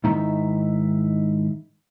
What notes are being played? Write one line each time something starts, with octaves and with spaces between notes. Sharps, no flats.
G#2 D#3 D#4 E4 E5 A#5